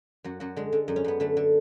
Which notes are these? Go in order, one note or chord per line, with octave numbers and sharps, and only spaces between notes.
F#2 F#4
F#2 F#4
D3 G#3
D3
F#2
C#4
F#2 B3
D3 A3
D3